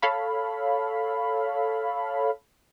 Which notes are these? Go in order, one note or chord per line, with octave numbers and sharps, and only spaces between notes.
A4 C#5 F5 B5